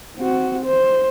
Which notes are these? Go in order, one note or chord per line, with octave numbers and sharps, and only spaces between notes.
C4 F#4
C5